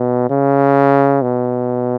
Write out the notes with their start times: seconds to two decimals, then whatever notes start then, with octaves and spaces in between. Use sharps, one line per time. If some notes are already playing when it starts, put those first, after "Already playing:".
Already playing: B2
0.30 C#3
1.22 B2